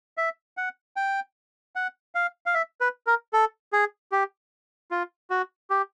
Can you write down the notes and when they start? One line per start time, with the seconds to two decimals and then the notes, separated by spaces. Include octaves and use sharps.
0.17 E5
0.57 F#5
0.96 G5
1.76 F#5
2.15 F5
2.46 F5
2.54 E5
2.81 B4
3.07 A#4
3.33 A4
3.73 G#4
4.12 G4
4.91 F4
5.30 F#4
5.70 G4